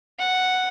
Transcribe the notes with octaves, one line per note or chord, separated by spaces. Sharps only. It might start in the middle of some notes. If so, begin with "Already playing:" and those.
F#5